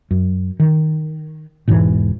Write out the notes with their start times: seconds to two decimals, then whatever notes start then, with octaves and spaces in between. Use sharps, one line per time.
0.11 F#2
0.60 D#3
1.68 E1 G#2 B2 E3